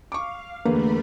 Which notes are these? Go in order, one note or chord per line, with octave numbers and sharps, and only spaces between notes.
F5 C#6 D6
E2 D3 A3 A#3 A#4 B4 B5